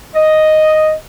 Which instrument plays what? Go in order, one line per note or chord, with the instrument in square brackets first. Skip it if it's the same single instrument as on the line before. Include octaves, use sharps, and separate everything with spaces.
[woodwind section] D#5